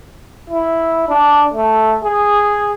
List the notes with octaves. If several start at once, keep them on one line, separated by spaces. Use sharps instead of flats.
E4
D4
A3
G#4